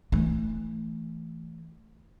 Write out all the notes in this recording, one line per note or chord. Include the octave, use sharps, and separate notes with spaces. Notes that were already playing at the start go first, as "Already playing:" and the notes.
E3 A3